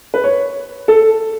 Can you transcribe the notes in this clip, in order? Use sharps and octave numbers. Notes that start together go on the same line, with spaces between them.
B4
C#5
A4